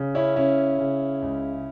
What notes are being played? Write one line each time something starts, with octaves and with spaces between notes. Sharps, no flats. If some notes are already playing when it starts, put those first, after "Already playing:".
Already playing: C#3
C#4 E4
C#3 C#4 E4
C#3
C#2